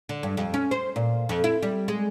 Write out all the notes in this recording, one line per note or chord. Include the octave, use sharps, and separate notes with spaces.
D3
G2
F2
C#4
C5
A#2
F2
E4
G3
G#3